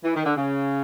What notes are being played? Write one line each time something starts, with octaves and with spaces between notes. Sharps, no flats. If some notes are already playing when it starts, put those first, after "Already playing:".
E3
D#3
D3
C#3